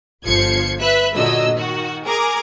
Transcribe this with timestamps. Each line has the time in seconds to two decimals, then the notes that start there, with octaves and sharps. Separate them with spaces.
0.24 G1 F3 G#6 C7 C#7
0.80 B4 E5 B5 F#6
1.15 A#2 D3 F#3 D#5 E6
1.55 D#3 F#4
2.06 G#4 A#4 A#5 D6 G#6